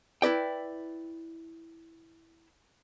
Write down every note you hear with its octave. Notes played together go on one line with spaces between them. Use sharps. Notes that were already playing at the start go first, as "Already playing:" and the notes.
E4 B4 D5 G5